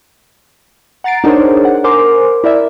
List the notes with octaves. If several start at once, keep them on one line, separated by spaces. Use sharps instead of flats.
F#5 A#5 A6 C7 D7
D4 D#4 G#4 A#4 C5 C#5
F#5
A#4 C5 G#5 C6 D6
E4 A#4 D5 E5